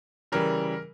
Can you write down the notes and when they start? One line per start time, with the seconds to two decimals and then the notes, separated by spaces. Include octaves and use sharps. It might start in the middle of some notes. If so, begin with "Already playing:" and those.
0.32 C#3 E3 G3 A#4